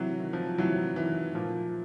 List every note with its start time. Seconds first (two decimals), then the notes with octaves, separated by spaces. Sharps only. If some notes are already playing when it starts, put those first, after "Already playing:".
Already playing: C3 E3 F#3
0.20 D#3
0.33 F3
0.58 C3 E3 F#3
0.96 D#3 E3
1.35 A#2 F3